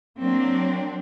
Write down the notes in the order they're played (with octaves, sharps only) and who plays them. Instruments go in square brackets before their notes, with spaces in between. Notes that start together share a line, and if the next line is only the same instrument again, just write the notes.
[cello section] F#3 A#3 C4 D4